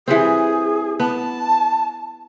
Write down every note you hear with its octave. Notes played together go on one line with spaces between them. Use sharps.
E3 G3 C4 G#4
B3 A5